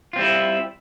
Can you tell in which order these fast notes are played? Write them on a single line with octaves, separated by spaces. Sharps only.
F4 C4 G3 E4